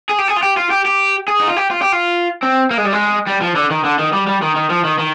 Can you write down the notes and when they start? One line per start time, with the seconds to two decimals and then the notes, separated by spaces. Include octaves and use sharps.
0.09 G#4
0.18 G4
0.28 G#4
0.36 F4
0.43 G4
0.57 F4
0.71 G4
0.86 G4
1.28 G#4
1.40 D#4
1.48 F4
1.57 G4
1.71 F4
1.82 G4
1.92 F4
2.43 C4
2.71 A#3
2.78 G#3
2.85 G3
2.93 G#3
3.27 G3
3.42 F3
3.56 D3
3.71 D#3
3.84 D3
3.99 D#3
4.13 G3
4.27 G3
4.42 D#3
4.56 D#3
4.70 F3
4.84 D#3
4.98 D#3